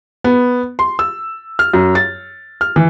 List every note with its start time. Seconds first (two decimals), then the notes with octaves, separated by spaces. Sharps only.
0.24 B3
0.79 C6
0.99 E6
1.59 F6
1.74 F#2
1.95 A6
2.61 F6
2.76 E3